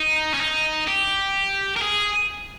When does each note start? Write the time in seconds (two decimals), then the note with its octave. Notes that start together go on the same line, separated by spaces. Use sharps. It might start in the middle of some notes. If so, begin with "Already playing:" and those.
Already playing: D#4
0.34 C#4
0.41 D#4
0.87 G4
1.76 A#4
1.82 G#4